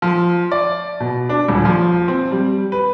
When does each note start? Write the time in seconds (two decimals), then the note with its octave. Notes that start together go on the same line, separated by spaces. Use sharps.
0.02 F3
0.51 D5
1.00 B2
1.29 D4
1.48 D#1
1.65 F3
2.08 C4
2.31 G3
2.72 B4